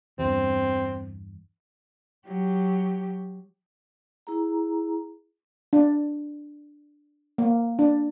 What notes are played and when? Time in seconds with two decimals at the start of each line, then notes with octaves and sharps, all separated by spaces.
0.19 E2 G2 C4
2.26 F#3 G4
4.27 E4 G#4 A#5
5.73 D4
7.38 A#3
7.79 D4